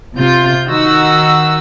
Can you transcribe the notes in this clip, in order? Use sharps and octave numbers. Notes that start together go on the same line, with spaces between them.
C3 F4 G6
D#3 D#4 F#4 E6